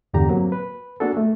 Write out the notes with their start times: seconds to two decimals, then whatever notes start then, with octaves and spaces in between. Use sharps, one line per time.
0.14 E2 G2 D3 G4 A#5
0.29 F#3 A#3 C4
0.52 B4
1.00 A#3 D4 F#4 G#4 A4
1.17 A3